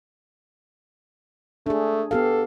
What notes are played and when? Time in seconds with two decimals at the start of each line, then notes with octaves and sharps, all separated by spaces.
1.66 A3 D4 G#4
2.11 B3 G4 A4 F5